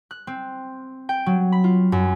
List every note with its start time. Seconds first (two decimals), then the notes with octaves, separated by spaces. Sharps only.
0.11 F#6
0.27 C4
1.09 G5
1.26 F#3
1.52 B5
1.64 F4
1.92 F#2